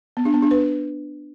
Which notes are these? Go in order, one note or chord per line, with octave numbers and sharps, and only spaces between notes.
B3
D4
B3
D4
B4